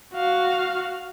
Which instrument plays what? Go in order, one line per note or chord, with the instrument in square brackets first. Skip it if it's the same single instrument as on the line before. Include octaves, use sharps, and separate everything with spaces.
[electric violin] F#4 F5